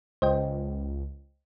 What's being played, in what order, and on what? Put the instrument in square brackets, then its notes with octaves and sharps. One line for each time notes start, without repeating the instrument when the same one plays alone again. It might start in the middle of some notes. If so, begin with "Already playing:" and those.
[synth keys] C#2 [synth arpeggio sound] C5 D#5 G5